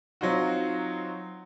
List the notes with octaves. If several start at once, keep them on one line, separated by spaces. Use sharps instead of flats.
F#3 C4 D#4 F4 F#4